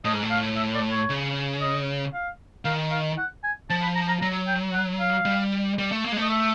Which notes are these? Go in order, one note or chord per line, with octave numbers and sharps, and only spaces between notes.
A2 D#5
G#2
A2
F5
E5
D5
C#5
C#3
D#5
F5
D#3 F5
F5
F#5
G#5
F3 A5
B5
A#5
A#5
F#3 A#5
G5
F#5
F5
G3
G3
A3
A#3
G#3
A3 D#5
E5